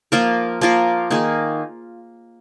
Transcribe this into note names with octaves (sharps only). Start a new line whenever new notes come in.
F3 A#3 F4 A#4
F3 A#3 F4 A#4
D#3 A#3 D#4 G#4